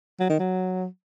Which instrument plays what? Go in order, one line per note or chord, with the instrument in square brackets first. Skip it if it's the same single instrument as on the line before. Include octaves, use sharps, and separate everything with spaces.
[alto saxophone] F#3
D#3
F#3